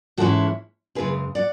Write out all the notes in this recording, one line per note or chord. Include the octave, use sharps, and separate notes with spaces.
G#2 E3 G#3 C#4 E4 F#4 A4
F#2 C#3 G#3 G#4 B4
D5 F#5